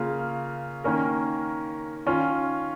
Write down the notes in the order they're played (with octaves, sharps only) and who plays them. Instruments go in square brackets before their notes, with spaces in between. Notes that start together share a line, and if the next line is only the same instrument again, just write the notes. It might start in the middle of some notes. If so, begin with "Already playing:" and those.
Already playing: [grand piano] C#3 A#3 F4 F5
D#3 A#3 C#4 A#4
D#3 C#4 F4